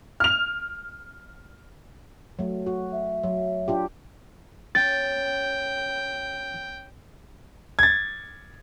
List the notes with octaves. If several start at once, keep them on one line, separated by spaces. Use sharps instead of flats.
F6 F7
F#3 A3
F#4
E5
F#3
D4 F4 G4
C#4 G5 A6
G#6 A6